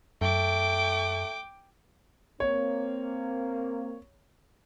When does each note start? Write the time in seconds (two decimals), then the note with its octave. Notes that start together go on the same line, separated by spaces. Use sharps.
0.21 F#2 A3 G5 D6
2.40 A#3 C4 C#5